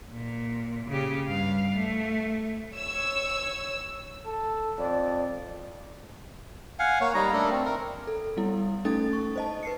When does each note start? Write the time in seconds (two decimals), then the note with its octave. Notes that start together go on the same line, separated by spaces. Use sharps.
0.11 A#2
0.89 C#3 G4
1.28 G2 F5
1.75 A3
2.74 C#5 E6
4.26 A4
4.78 F2 D5
6.79 F5 F#5 G#5
7.01 A#3 C#5
7.14 G3 D#4 A#5
7.33 A3 D4 A4 A#4
7.51 C4
7.65 A#4
8.07 A4
8.37 G3 B3 E4
8.85 A3 C#4 D#4 A4 D#6 A6
9.13 C#6
9.36 C5 D#5 A5
9.63 B4 C7 C#7